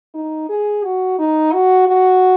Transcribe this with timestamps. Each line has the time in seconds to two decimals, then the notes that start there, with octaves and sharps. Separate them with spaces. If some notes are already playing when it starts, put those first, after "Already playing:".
0.14 D#4
0.49 G#4
0.83 F#4
1.19 D#4
1.52 F#4
1.88 F#4